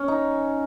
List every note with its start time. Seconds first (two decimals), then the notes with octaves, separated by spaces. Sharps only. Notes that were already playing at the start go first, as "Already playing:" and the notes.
Already playing: C#4
0.08 D#4